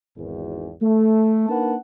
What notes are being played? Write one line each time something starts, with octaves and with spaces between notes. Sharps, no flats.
G#1 E2
A3
A#3 D4 D#4 B4 F#5 A5